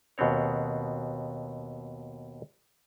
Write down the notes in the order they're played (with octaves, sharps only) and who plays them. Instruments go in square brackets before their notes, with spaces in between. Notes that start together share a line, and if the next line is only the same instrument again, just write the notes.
[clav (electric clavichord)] D#2 B2 B3 C4 C#5